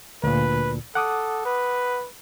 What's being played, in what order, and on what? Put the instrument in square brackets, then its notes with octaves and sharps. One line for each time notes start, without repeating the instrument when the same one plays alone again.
[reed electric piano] D2 A#2 [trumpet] B4
[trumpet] A4 [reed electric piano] F#5 D6 D#6
[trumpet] B4